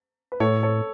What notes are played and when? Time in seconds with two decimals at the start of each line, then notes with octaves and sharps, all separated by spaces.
0.32 B4
0.40 A2 A4 C#5
0.63 A4 C#5